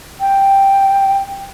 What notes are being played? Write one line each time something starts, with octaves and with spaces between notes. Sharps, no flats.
G5